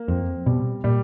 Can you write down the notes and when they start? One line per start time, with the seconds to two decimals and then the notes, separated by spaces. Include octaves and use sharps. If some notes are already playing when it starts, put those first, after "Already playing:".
Already playing: A#3
0.08 F2 C4
0.46 B2 G3
0.84 A#2 G3